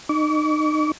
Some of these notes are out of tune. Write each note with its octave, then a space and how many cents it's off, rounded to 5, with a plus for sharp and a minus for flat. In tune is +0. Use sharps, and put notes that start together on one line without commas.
D#4 -25 D6 -45